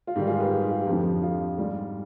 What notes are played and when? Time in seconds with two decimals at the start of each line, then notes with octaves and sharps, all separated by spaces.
0.07 F4
0.15 G#2 D#3 G3 G4
0.27 F4 G#4
0.40 G4 B4
0.51 G#4
0.62 G4
0.70 F4
0.80 G4
0.87 F2 D3 F3
1.23 F4
1.57 G#2 G3